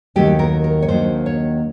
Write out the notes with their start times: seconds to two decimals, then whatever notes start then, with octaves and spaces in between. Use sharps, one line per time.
0.16 D#2 D#3 F#3 A3 G4
0.39 A#4
0.64 A#4
0.82 C#5
0.89 D#2 D#3 F#3 A#3 D4 C5
1.26 C#5